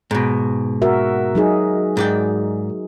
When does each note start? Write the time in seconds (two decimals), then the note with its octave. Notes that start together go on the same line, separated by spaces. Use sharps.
0.11 G#2 B2
0.82 F#4 A#4 E5
1.35 F#3 D#4 G#4
1.97 G#2 D5 G5